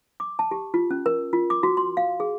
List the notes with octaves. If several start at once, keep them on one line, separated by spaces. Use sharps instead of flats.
D6
A5
G4
F4
C#4
A#4
F4
D6
F#4
C6
F5
G#4